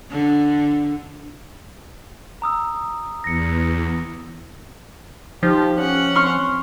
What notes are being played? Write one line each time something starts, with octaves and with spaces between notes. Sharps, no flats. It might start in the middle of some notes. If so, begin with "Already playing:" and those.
D3
A#5 D#6 E6
E2 A#6 C#7
F3 D#4 G4 A5
C#4 C#5 F#5
C4 C6 C#6 F6